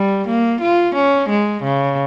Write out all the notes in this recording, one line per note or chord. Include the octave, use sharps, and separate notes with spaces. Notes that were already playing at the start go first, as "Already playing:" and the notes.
Already playing: G3
A#3
F4
C#4
G#3
C#3